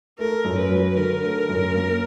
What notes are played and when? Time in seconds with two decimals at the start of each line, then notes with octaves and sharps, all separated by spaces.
0.19 A3 A#4
0.44 F#2
0.58 B4
0.71 F#3
0.97 D3 A#4
1.23 A3
1.49 F#2
1.75 A#3